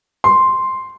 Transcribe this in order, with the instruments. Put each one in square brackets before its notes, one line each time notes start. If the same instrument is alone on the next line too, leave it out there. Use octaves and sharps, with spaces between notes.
[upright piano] C6